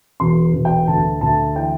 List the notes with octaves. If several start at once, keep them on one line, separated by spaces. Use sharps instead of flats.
E1 C6
E1
G5
D2 A5
D2 A5
E3 G5